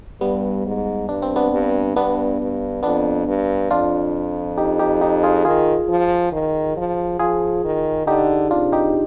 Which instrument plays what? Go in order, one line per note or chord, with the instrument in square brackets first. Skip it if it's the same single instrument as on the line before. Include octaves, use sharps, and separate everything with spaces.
[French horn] G2 [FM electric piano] G3 B3
[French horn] G#2
[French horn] G2 [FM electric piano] D4
[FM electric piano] C4
B3 D4
[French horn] G2
[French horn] G2 [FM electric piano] B3 D4
[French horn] G2
[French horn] F2 [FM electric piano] B3 D4
[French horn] G2
[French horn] F2 [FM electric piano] D4 F4
[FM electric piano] D#4 G4
D#4 G4
D#4 G4
F4 G#4
[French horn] D#3 [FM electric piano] F4 G#4
[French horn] F3
D#3
F3
[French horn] F3 [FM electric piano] F4 G#4
[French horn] D#3
[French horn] D3 [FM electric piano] D#4 G4
[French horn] C3 [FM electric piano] D4 F4
[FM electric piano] D#4 G4